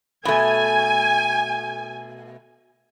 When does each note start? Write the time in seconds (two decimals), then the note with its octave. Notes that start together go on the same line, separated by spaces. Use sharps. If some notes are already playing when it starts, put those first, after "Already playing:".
0.25 B2 A3 G#5